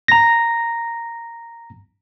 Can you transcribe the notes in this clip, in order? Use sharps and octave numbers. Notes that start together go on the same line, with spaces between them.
A#5 A#6